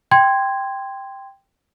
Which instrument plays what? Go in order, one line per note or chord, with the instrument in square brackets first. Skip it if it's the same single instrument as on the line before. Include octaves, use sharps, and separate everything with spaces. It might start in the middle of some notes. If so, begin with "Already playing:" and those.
[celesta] G5 C6 G#6